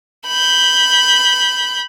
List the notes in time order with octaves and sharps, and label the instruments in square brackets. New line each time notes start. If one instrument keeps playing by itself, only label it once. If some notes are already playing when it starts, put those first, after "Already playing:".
[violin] B5 G6